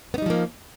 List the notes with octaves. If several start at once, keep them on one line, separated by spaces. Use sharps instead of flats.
F3 G3 A#3 B3 D#4